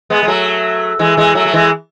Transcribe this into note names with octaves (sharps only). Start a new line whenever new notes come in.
G#3 B3
G#3
F#3 A3
E3 G#3
E3 G#3
F#3 A3
A3
E3 G#3